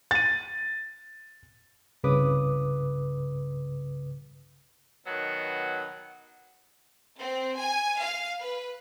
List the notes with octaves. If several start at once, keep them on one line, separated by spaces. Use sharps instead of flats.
A6 D#7
C2 G2 C#3 B4 D6 D#6
B2 D#3 F#3 B3
C4
G#5
F5
B4